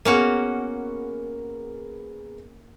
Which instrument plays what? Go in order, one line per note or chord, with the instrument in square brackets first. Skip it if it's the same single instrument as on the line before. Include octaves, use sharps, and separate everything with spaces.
[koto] A#3 C#4 F#4 [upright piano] B3 G#4 A#4